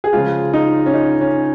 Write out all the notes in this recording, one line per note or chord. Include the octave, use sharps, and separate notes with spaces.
G#4
C#3 F3 G#3 F4
D#4
C#4
D#4
C#4